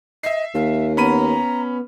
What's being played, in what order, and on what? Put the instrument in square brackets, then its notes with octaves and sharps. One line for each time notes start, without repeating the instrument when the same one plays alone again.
[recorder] D#5 [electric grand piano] E5 C7
[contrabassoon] D#2 [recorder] F5
[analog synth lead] B3 [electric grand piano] C#4 B5 D#7 [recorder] A#5